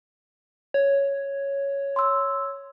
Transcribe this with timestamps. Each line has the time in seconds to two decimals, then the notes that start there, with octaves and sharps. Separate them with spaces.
0.74 C#5
1.96 C6 E6